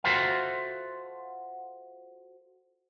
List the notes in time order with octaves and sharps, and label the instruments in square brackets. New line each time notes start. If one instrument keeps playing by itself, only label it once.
[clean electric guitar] F4 F#4 A4 C5 E5 F5